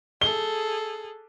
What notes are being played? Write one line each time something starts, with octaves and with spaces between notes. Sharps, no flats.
G#4 A4 G7